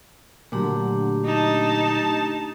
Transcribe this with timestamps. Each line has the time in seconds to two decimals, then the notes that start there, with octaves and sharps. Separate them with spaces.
0.52 A#2 D3 F#3 A3 D4 G4
1.26 D#4 A5